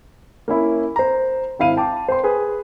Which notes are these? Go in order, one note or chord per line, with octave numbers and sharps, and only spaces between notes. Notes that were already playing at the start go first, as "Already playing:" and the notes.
A#3 C#4 E4
C5 A#5
G#1 E4 F5 D#7
G5 A5 D6
C5 C6
G#4 B4